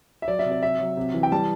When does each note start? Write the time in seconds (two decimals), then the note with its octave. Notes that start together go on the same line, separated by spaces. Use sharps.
0.22 E5
0.28 F#3 D5
0.39 E5
0.45 C3
0.52 D5
0.63 C3 E5
0.79 F#3
0.97 C3
1.14 E3
1.23 G5
1.32 G3 A5